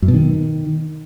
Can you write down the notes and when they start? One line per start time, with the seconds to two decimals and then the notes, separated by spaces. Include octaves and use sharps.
0.02 F#2
0.08 B2
0.14 D#3